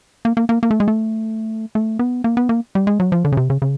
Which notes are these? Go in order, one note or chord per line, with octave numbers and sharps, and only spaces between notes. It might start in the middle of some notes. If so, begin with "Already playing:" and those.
A#3
A#3
A#3
A#3
A3
G#3
A3
A3
B3
A#3
B3
A#3
G3
G#3
F#3
F3
D3
C#3
C3
C#3
C#3